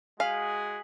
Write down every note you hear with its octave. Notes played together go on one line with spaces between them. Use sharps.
G#3 F#4 G#4 F5 G#5 B6 F#7